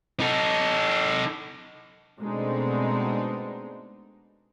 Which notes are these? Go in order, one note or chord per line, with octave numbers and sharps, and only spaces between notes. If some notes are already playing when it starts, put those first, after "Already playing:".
D#4 A4
B2 G#3 A3 C4 D4 D#4